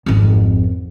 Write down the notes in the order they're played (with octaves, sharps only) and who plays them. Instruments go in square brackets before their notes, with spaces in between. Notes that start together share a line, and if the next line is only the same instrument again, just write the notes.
[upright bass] G#1 F2